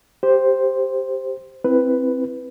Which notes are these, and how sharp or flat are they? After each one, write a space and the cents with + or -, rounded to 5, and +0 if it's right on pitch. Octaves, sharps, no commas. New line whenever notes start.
G4 +0 C5 +0
C4 +0 E4 +0 B4 +5